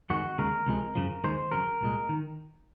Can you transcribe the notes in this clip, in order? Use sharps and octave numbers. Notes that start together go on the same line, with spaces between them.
F2 D#3 G#3 F#4
D#2 C#3 G#3 A#4
C#2 C3 F3 G#3
F#2 C#3 F3
D#2 D#3 G#3 C5
F2 C#3 F#3 A#4
C2 A#2 G#3
D#3